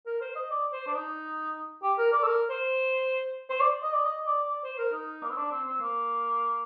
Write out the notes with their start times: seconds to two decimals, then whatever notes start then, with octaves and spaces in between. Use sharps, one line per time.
0.06 A#4
0.21 C5
0.35 D#5
0.51 D5
0.72 C5
0.87 D4
0.95 D#4
1.82 G4
1.98 A#4
2.12 D5
2.23 A4
2.27 A#4
2.50 C5
3.50 C5
3.60 D5
3.83 D#5
3.93 D5
4.05 D#5
4.26 D5
4.48 D5
4.64 C5
4.78 A#4
4.92 D#4
5.23 A#3
5.30 C4
5.37 D4
5.51 C4
5.67 C4
5.81 A#3